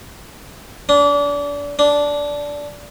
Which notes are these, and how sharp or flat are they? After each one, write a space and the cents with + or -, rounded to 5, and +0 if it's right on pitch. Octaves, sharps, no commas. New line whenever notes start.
D4 -30
D4 -10